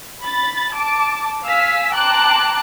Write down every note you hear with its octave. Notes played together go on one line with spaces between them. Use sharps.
B5 A6
A5 D6
F5 G#5 E6 B6
G5 A5 A#5 C6 D6 F#6